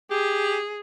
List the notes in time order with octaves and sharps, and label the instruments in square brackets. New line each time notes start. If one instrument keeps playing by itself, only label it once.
[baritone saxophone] G4 [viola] G#4